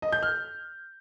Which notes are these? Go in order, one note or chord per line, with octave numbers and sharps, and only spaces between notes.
D#5
G6
F6